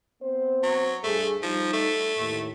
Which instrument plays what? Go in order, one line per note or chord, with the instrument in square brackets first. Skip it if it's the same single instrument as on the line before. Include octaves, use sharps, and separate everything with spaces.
[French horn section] B3 C4 C5
[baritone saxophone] F#3
[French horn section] D2 G2 G#4 [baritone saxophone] A3
[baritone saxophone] F3 [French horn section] G3 D#4
[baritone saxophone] A3
[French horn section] D#2 A2